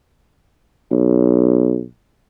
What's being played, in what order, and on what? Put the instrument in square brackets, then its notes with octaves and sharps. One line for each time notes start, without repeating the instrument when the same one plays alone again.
[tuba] B1